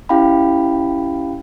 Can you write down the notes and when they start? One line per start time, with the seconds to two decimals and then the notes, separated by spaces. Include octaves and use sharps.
0.09 C#4 E4 G4 F5 G5 B5